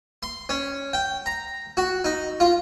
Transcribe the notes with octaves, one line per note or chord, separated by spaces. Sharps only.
C6
C#4
G5
A#5
F#4
D#4
F4